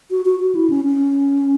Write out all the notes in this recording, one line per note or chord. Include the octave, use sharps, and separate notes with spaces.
F#4
F#4
F#4
E4
C#4
C#4